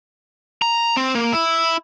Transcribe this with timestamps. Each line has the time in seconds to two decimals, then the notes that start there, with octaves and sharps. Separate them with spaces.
0.62 A#5
0.97 C4
1.15 A#3
1.33 E4